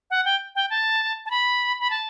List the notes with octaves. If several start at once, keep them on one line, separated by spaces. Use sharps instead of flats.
F#5
G5
G5
A5
A5
B5
B5
A5